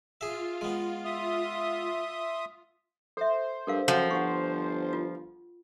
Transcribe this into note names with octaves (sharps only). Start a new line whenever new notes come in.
F4 G#4 E5
G#3 B3
E5 C6 D#6
A4 C5 E5
G2 A4 A#4 F5
F#2 F3 A4 F#5 G5
G1 F#5 C#6
F4